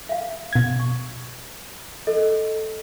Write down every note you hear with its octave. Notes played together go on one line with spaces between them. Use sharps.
E5 F5
B2 G#6
C#6
A4 D#5